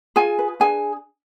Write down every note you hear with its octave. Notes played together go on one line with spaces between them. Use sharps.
F4 G#4 G#5
B4
D4 G#4 G#5